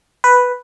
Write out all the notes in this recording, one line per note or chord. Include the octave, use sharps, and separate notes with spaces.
B4